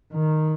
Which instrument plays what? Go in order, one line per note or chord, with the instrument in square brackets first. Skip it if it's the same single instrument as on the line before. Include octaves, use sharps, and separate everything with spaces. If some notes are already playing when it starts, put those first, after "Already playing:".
[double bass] D#3